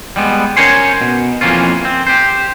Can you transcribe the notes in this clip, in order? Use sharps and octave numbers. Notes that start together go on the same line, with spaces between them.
G3 G#3 B3
C#4 A#4 C5 C#5 G#5 C6
B2
F2 E3 A#3 C#4 F4
C4
G4 C5